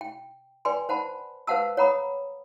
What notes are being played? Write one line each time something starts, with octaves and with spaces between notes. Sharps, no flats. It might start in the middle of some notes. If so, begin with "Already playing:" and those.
G5
B4 D5 G5 G#5 C6
C5 F#5 A5 B5
B4 C5 F5 F#5 A5 E6
C#5 F#5 A#5 B5 D#6